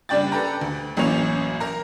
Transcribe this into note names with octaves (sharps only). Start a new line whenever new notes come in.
F#1 G3 D4 D5 G5 A6
A4 B4 G5 A#5
D2
A1 F#2 E3 A#3 C#5 F7
A#4 A#5